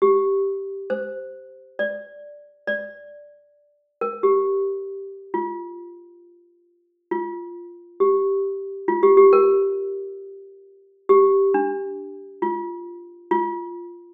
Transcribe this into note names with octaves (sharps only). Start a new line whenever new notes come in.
G4
C5
D5
D5
A#4
G4
F4
F4
G4
F4
G4
G4
A#4
G4
D4
F4
F4